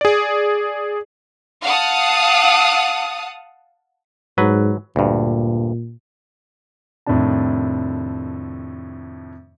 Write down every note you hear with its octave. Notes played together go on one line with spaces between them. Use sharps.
G#4 D5
F5 F#5 A5 D#6
G#2 F#3 B4
D2 G2 A#2
F2 A2 C3 D#3 D4 A5